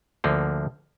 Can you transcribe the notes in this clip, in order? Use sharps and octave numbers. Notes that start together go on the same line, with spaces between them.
D2 D3 F3 A#3